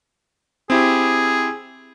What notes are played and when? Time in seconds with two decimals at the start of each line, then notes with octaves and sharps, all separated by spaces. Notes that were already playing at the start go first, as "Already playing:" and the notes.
0.70 C4 E4 G4 G#4